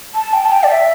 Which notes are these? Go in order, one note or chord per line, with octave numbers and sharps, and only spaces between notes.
A5
G5
A5
G5
D5
E5